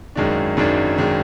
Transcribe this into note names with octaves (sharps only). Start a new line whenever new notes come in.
G#1 F#2 D#3 G#3 D4
G#1 F#2 D#3 G#3 D4
G#1 D#3 G#3 D4